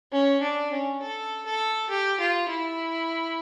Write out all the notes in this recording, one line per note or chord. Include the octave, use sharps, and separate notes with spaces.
C#4
D4
C#4
A4
A4
G4
F4
E4